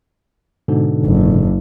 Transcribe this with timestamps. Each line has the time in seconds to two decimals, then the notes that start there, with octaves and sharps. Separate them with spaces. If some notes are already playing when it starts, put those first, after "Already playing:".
0.68 G#2 B2 D3
1.05 F#1